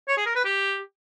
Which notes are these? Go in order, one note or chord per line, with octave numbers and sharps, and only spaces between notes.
C#5
G#4
A#4
B4
G4